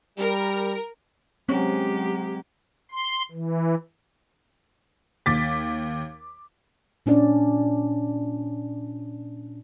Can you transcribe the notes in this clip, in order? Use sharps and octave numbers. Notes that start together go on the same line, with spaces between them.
G3 A#4
F#3 G#3 C4 C#4 G4 F#5 A#5
C6
E3
D#2 D6 A6 B6
A#2 C#4 D4 D5